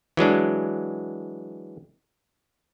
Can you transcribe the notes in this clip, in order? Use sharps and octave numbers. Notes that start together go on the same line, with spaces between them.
E3 F#3 G#3 D4